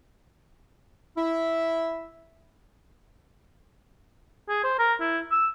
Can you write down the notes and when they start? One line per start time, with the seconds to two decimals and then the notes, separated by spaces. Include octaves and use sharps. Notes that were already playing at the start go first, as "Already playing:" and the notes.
1.17 E4 E5
4.49 G#4
4.64 C5
4.79 A#4
5.00 E4
5.32 E6